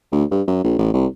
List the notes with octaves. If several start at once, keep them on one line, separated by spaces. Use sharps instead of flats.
D2
G2
F#2
A#1
A1
C2